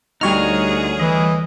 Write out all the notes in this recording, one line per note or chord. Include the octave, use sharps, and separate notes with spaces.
D2 G3 D#4 F#4 G#4 C#5 F6
E3 D#5